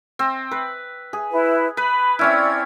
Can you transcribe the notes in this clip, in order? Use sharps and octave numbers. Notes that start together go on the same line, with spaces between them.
C4
B4
G#4
E4 B4
B4 B5
C4 C#4 E4 D5 G#6